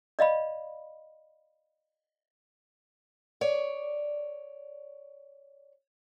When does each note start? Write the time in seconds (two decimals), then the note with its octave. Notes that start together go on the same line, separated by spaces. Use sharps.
0.19 D5 D#5 F5 B5
3.41 C#5 D5